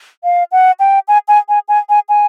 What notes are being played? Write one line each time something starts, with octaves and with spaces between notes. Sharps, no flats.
F5
F#5
G5
G#5
G#5
G#5
G#5
G#5
G#5